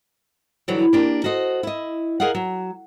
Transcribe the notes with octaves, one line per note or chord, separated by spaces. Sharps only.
D3 E3 F#3 G3
A#3 D4 G4
F#4 A4 C5 D#5
E4 D#5
G#4 A#4 D#5 F5 F#5
F#3